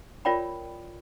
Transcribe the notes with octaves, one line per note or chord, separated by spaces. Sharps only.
F4 A#4 C#5 D5 G5 B5